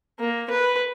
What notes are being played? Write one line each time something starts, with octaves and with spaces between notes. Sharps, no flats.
A#3
B4